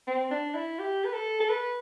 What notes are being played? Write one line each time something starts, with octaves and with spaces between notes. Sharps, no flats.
C4
D4
E4
G4
B4
A4
A4
B4